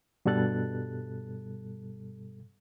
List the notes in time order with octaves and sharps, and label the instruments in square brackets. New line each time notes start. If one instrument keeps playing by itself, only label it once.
[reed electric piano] G2 B2 G3 A4 F#6 A6